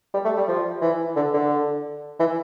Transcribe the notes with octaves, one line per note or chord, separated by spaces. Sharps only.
G3
A3
G3
F3
E3
D3
D3
E3